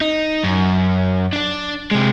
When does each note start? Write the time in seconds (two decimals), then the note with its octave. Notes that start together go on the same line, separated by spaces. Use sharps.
0.01 D#4
0.44 F#2
1.33 D4 D5
1.91 C3 G#3